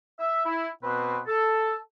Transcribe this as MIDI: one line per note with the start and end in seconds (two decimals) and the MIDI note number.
0.19 0.45 76
0.46 0.69 64
0.83 1.18 47
0.83 1.18 60
0.83 1.18 71
1.27 1.75 69